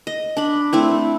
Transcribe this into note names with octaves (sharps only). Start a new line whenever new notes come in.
D#5
D4 B5
A3 C4 E4